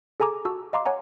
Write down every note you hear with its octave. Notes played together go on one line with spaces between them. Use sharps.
G#4 A4 G#5 A#5 D6
F#4 A5 E6
D#5 F5 A#5 C6 D6
C#5 F#5 G#5 A#5